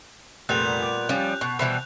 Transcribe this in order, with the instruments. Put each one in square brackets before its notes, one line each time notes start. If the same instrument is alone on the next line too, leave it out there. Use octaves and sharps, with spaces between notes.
[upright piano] F1 [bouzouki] A#2 G3 B3 [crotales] F#6 G6 F7
[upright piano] D6
[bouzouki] F3 G3 [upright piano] C#4 G4
[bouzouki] B2 [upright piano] C#6
[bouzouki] B2 E3 G3 [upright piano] C5 B5